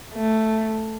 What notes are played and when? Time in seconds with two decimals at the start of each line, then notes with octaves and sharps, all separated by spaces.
0.15 A3